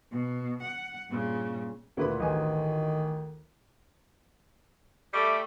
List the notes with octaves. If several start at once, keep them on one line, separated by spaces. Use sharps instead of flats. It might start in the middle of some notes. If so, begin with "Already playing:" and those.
B2
F#5
G2 A#2 C#3
D2 A#2 A#3 E4 B4 B5
A1 D#3 D#4 B4 G#5
G3 A3 D6